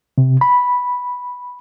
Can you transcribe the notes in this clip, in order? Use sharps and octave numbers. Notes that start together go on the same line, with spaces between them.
C3
B5